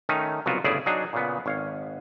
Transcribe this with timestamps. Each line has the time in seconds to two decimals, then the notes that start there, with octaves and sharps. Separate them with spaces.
0.09 D#3 A3 C#4 D#4
0.46 C2 C#3 F#3 B3 F4 F#4
0.64 G1 A2 C#3 E4 G#4 D5
0.86 F#3 D4 D#4 G#4
1.13 A#2 C#3 B3
1.46 G#1 C#5 F5